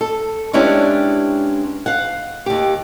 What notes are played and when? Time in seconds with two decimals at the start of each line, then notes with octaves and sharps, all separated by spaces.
0.01 A4
0.53 G#3 B3 C#4 D4 E4 G4
1.86 F5 F#5
2.46 D#2 G4